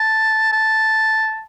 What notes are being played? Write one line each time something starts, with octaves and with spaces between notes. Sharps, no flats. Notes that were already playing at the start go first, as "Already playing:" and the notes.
Already playing: A5
A5